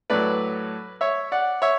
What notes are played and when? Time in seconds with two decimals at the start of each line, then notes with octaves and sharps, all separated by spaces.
0.10 A2 F#3 B4 D5
1.01 C#5 E5
1.32 D5 F#5
1.62 C#5 E5